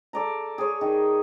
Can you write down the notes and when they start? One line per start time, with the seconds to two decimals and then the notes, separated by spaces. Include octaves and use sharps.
0.13 A4 D5 A#5
0.58 G#4 C#5
0.81 D#3